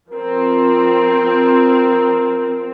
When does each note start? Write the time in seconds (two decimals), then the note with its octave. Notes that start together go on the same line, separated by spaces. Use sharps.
0.10 F3 C4 A#4